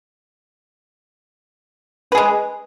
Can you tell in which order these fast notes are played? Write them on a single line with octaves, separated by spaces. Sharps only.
B4 G#4 G#3